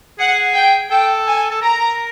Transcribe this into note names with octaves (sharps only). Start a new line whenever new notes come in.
G#4 F#5
G5
A4 G5
G#5
A4
A#4 A#5